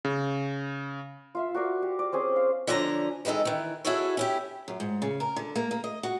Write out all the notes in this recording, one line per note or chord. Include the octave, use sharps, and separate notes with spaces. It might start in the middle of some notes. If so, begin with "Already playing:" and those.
C#3
F4 E5 F5
F#4 A#4 D5 F5
G4
D5
C4 C#4 G#4 C5
F5
D3 F3 C#4 D4 E4 A#5
D#3 E3 G#3 D#4 A4
D#3 E3
E4 F#4 G#4 A4 C#5
C#4 E4 G4
F#2
G#2
C#3
A#4
D3
A#3
A#3
D#5
F#4